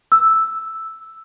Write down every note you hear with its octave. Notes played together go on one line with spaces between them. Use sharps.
E6